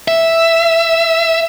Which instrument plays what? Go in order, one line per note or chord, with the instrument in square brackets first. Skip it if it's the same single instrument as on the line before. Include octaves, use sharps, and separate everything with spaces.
[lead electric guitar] E5